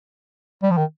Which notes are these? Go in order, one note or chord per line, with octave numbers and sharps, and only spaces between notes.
G3
F3
D#3